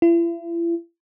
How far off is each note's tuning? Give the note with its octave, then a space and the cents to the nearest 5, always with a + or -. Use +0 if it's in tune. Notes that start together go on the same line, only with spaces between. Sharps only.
E4 +40